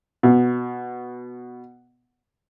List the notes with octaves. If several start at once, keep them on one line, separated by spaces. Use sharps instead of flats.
B2